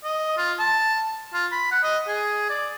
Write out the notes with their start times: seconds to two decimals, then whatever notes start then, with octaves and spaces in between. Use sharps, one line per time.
0.04 D#5
0.38 F4
0.59 A5
1.33 F4
1.52 B5
1.71 F#5
1.83 D#5
2.08 G#4
2.49 D5